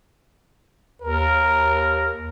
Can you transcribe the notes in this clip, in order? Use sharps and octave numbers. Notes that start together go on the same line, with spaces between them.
D#2 A#4